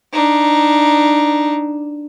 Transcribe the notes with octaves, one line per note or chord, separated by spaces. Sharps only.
D4 D#4